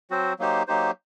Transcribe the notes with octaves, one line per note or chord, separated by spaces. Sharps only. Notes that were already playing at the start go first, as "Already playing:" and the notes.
F#3 C4 F#4 C5
F#3 A#3 D#4 G4 C5
F#3 A#3 D#4 G4 C5